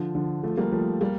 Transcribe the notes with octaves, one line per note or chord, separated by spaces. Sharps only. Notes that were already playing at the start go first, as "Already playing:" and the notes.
Already playing: D3 F3
D3 F3
F3 A3
G3 A#3
F3 A3
G3 A#3